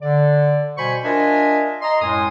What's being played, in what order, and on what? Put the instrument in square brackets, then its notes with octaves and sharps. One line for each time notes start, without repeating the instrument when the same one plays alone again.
[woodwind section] D3 D5
B2 G3 C5 G#5 B5 C#6
D4 F4 A#4 D#5 E5 G#5
D#5 A#5 C6
F#2 A2 G#3 G#5 C6 D#6